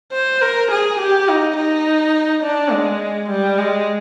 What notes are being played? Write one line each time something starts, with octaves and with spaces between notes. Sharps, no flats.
C5
A#4
G#4
G4
D#4
D#4
D4
G#3
G3
G#3